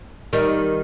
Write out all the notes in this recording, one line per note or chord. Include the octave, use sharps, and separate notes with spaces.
D#3 G3